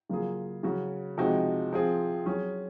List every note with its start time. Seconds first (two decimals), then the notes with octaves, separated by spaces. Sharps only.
0.09 C#3 F#3 A#3 F4 G#4
0.63 C#3 F#3 C#4 F#4
1.18 C3 F3 G#3 D#4 F#4
1.73 F3 C4 F4 G#4
2.26 F#3 C#4 G#4